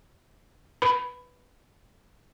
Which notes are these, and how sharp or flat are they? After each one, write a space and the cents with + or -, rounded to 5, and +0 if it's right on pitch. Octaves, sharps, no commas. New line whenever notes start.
B4 -5 B5 +10